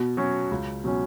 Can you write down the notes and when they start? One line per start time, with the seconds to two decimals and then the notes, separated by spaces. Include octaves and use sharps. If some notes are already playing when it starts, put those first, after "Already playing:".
Already playing: B2
0.17 F#3 C#4
0.51 C#2
0.84 B2 F#3 C#4